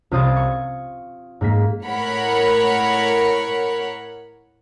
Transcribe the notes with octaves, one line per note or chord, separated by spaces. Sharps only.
C2 F4 C5 D#6 G#6 A6
C#6
G#2 A#3 B6
A2 A#4 C#5 F#5 B5